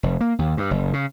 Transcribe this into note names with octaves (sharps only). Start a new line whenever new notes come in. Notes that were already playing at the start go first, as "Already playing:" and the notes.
F1
A#3
D#2
G2
F#1
C#3